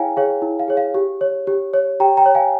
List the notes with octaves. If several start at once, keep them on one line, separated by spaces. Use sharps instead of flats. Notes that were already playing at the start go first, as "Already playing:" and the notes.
Already playing: E4 G#4 C#5 F5 G5 G#5 A#5
G#4 C#5 F5
E4
F5
G#4 C#5
F5
G4
C#5
G4
C#5
G4 G5 A#5
G5 A#5
C#5
F5 G#5